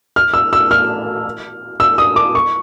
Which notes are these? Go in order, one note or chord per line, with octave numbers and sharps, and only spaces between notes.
F6
E6
E6
F6
E6
D#6
D6
C#6